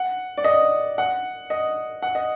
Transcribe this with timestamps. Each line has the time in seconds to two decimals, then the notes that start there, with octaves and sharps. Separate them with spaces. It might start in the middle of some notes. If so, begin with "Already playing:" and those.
Already playing: F#5
0.38 D5
0.44 D#5
0.98 F#5
1.50 D#5
2.02 F#5
2.15 D#5